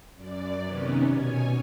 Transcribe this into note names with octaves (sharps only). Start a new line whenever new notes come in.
F#2 D5
C3 D#3 B3 C#4
B2 C#5 G#5